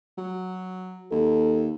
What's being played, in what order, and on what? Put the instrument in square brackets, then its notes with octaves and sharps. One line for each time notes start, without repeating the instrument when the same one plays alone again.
[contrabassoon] F#3
[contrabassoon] D#2 [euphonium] A4